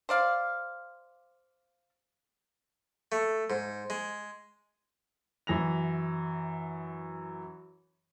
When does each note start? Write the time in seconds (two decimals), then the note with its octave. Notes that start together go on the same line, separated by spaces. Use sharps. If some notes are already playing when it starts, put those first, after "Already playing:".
0.09 C5 D5 F5
3.12 A3
3.50 G#2
3.90 G#3
5.47 F#2 E3 A#6 F7